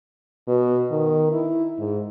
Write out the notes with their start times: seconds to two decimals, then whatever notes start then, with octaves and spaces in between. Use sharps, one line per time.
0.47 B2
0.91 D#3
1.32 E4
1.79 G#2